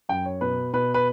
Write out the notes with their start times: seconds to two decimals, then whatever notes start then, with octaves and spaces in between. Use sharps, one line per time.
0.09 F#2 G5
0.26 C#5
0.41 B2 B4
0.73 B2 B4
0.94 B4